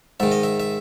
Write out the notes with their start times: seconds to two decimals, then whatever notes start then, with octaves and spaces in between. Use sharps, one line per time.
0.20 G#2 D#3 E5
0.32 D#5
0.43 E5
0.60 E5